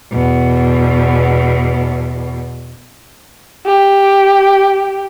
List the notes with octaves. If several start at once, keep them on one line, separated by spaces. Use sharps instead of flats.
E2 B2
G4